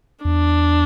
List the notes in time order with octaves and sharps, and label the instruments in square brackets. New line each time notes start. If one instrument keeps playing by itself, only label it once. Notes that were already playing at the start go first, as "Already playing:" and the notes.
[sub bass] E2 [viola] D4